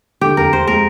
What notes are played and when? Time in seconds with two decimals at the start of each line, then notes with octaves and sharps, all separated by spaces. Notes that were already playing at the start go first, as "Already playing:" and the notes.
0.21 D3 G4
0.37 F2 A#4
0.53 F2 C5
0.67 G#3 A#4